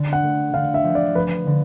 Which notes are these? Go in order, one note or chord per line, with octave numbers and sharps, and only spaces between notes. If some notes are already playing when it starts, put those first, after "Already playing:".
Already playing: D3
F#5
A3
D3 F5
E5
F3
D5
F3 B4
D3